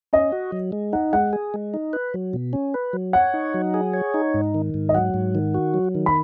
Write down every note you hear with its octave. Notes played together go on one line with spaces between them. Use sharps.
C#4 D#5
F#4
F#3
G#3
D#4 F#5
G#3 F#5
G#4
G#3
D#4
B4
F#3
B2
C#4
B4
F#3
C#5 F#5
D#4
F#3
G#4
C#5
D#4
G#2
D#3
G#2
D#5
F#3 F#5
G#2
D#3
F#4
F#3
D#3
B5